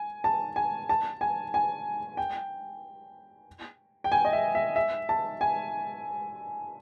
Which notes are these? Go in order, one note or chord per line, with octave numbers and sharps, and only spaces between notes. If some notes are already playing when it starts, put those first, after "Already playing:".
Already playing: G#5
A5
G#5
A5
G#5
G#5
G5
G5
G#5
D#5
E5
E5
E5
A5
G#5